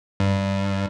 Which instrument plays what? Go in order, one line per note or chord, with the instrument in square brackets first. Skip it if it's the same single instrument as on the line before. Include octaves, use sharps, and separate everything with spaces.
[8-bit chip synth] G2